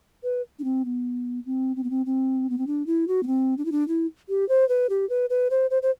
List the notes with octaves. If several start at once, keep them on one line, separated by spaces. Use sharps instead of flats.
B4
D4
C4
B3
C4
C4
B3
C4
C4
B3
C4
D4
E4
F#4
B3
C4
D4
E4
D4
E4
G4
C5
B4
G4
B4
B4
C5
C5
C5